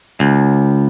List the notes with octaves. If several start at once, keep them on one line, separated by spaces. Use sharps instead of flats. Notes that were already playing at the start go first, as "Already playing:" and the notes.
C#2